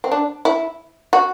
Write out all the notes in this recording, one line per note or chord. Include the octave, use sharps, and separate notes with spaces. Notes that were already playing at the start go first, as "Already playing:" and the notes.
C4
D4
E4
F#4